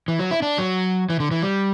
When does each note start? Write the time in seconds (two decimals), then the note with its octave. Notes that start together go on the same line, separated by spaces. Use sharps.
0.08 E3
0.19 F#3
0.31 E4
0.42 D4
0.58 F#3
1.10 E3
1.20 D3
1.31 E3
1.42 G3